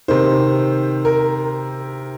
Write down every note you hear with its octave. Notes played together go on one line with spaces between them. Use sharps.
C3 D#3 C5
A#4